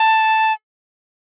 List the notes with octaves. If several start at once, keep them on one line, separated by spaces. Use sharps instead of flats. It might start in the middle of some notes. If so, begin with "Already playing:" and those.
Already playing: A5